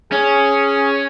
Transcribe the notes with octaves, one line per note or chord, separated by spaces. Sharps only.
C#4 G#4